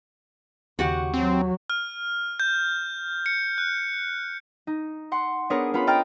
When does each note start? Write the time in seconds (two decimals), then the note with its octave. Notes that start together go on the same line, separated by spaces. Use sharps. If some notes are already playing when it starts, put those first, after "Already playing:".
0.79 D#2 C#3 F#4 G4 F#5
1.14 F#3 C4
1.70 F6
2.40 G6
3.26 C#7
3.58 F#6
4.67 D#4
5.12 F#5 C6
5.50 B3 D4 G#4 A#4 C#5
5.74 B3 C#4 F4 B5
5.87 D#5 G5 A#5 F6 A6 D7